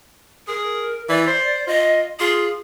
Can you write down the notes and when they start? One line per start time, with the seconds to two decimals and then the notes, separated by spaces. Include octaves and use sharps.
0.48 G#4 A#4
1.09 E3 D5
1.27 C5
1.67 F4 D#5
2.20 F4 G#4